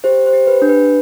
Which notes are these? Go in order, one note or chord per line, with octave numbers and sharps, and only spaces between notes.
G4 C5
C5
G4
B4
D4
B4